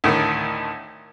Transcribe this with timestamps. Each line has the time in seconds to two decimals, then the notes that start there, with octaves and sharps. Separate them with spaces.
0.04 D2 A2 D#3